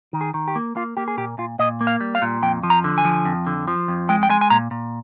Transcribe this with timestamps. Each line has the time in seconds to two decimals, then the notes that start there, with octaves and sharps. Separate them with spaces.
0.13 D#3
0.21 G#4
0.34 D#3
0.48 G4
0.56 A#3
0.76 A#3 F4
0.97 A#3 G4
1.08 G#4
1.17 A#2 G4
1.38 A#2 F4
1.59 A#2 D#5
1.81 A#3
1.87 F5
2.01 G3
2.15 F5
2.22 A#2
2.42 F2 G5
2.63 F3
2.70 A#5
2.84 D3
2.98 G#5
3.05 F3
3.25 F2
3.47 D3
3.68 F3
3.88 F2
4.09 G#3 G5
4.23 G5
4.30 G#3 G#5
4.41 G#5
4.50 A#2 A#5
4.71 A#2